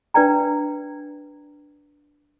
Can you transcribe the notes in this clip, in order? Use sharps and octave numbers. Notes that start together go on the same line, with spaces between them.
D4 B4 D5 G5 A#5